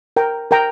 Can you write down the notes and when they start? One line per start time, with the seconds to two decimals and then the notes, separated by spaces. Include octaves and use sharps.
0.16 A#4 G5 A#5
0.51 A#4 G5 A#5